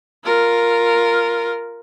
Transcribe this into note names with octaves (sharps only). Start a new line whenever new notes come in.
F4 A#4